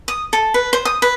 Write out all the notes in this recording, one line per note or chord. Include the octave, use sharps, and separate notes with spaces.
D#6
A4
B4
C5
D#6
B4